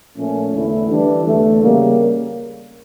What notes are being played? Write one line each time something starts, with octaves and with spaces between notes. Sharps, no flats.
A#2 F3 A3 C#4
E2 D3 A3 E4
E3 G3 D4
E2 D3 A3
C#3 G3 A#3